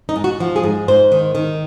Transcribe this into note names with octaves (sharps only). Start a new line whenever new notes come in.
D#4
G#2
F#4
F3
G#4
G#2
G#2 C5
D#3
D#3